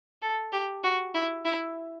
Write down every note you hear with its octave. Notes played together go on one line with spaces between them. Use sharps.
A4
G4
F#4
E4
E4